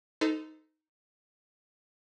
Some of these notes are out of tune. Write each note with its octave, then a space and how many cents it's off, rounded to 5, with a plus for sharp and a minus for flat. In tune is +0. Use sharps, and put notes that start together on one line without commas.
D#4 +5 A4 +0 C5 -35